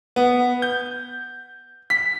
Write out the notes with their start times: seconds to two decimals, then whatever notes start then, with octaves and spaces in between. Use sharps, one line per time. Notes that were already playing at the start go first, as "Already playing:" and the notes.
0.16 B3
0.62 G6
1.90 B6